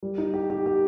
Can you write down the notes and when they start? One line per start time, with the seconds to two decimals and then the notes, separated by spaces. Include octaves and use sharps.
0.03 G3
0.18 D#4
0.34 G4
0.50 G4
0.66 G4